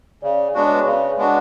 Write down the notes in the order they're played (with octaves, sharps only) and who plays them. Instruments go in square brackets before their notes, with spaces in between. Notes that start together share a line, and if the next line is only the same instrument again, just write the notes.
[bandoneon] C#3 [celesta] D5
[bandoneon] G#3 B3 D4 F#4 [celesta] D5
[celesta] C#5
B4
[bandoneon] C#3 [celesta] C#5
[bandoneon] G#3 B3 D4 F#4